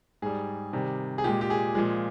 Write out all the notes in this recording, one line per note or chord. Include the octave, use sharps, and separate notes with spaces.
G#2 G3 G#4
C3 D#3 G3
G#4
A#2 G#3 G4
G4
G#4
A#2 F3 G#3